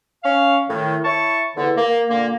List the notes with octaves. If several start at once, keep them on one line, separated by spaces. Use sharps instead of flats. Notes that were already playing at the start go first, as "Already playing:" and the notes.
C#4 F5
A2 D#3
E4 C#5 A5 C#6
E2 D3
A#3
A#2 D3 A#3